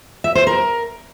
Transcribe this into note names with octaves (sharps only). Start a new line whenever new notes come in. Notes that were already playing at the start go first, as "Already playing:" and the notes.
E5
C5
A#4